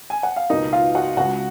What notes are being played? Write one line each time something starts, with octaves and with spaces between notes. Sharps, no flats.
G#5
F#5
F5
C#2 B2 A#3 D#4 D#5
F4 F5
F#4 F#5
C#2 C#3 G#3 F#4 F#5